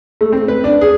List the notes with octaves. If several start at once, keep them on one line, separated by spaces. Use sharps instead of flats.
A3
C4
B4
D4
G#4